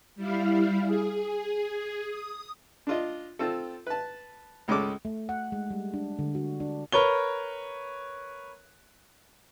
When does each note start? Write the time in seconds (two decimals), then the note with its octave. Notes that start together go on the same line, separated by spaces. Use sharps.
0.16 G3 E4 F5
0.85 G#4
2.09 D#6
2.87 D4 F4 D#5
3.39 C4 F4 A4
3.87 B4 A5
4.68 C#2 G#3 C#4 A4 D6
5.05 A3
5.29 F#5
5.52 G#3
5.71 G3
5.94 D4
6.19 D3
6.35 F#4
6.60 D4
6.92 A#4 B4 C#5 G7